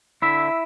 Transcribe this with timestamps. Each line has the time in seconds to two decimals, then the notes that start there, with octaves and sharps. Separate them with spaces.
0.22 D3 E4 E5